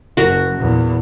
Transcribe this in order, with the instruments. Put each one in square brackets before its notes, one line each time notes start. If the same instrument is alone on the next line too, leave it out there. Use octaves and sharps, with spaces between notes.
[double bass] F#1 [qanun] F#4 A#4 A#5
[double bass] E2 A#2